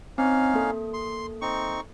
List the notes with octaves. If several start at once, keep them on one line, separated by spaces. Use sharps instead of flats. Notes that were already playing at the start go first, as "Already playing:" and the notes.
C4 C#4 D#4 F5
A#3 A4
C6
C4 D#4 C#6